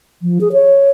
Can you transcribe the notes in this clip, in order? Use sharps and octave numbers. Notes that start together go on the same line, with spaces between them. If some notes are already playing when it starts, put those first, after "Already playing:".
F3
G#4
C#5